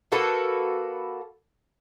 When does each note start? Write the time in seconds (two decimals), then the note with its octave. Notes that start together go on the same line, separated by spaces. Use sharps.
0.12 A#3 F#4 A4 B4